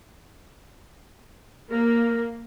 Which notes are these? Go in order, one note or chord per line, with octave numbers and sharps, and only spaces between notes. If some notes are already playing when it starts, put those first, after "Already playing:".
A#3 A#4